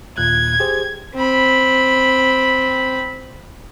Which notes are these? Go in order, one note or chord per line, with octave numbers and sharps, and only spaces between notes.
D#2 A#2 F#6 G#6
G4 G#4 C5
C4 B5